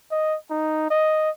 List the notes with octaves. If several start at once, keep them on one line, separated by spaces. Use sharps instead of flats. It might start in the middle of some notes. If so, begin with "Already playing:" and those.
D#5
D#4
D#5